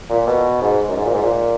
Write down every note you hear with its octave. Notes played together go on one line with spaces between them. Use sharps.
A#2
B2
G#2
F#2
G#2
A#2
G#2
A#2